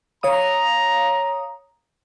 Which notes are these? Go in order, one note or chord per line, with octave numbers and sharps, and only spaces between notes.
C#5 F5 A#5 D#6